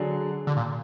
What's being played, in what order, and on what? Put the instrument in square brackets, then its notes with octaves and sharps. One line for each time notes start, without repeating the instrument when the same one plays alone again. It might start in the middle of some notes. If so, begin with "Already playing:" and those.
Already playing: [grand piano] D3 F#3 D4 G#4
[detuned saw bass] D3
A#2